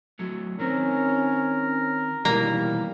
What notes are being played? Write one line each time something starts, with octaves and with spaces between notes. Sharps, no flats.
F#3 A3
D#3 C4 C#4 A#4
B2 D#3 E3 G3 A#3 A#5